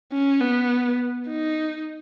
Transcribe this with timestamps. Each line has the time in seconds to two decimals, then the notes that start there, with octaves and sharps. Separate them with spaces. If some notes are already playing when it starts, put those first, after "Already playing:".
0.13 C#4
0.42 B3
1.28 D#4